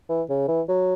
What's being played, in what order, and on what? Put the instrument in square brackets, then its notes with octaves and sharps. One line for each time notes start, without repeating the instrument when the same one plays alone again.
[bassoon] E3
C#3
E3
F#3